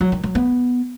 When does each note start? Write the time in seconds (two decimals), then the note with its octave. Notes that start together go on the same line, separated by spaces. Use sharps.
0.01 F#3
0.12 D#3
0.24 F#3
0.35 B3